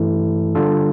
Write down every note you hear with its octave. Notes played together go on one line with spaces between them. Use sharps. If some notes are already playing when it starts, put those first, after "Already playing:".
Already playing: G2 E3 A3 E4 A4
D3 G3 D4 F4 A4